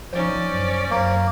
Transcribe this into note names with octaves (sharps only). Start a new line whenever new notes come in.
F3 C#4 D#4 C5 D5
F#2
F#2 A#3